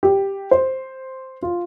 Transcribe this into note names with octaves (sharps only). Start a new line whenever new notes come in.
G4
C5
F4